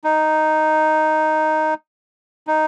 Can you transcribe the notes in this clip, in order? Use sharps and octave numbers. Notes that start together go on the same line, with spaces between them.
D#4
D#4